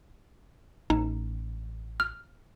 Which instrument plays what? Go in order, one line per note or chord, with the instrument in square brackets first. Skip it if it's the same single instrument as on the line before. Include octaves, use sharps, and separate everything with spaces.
[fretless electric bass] A1 [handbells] D#4
[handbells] F6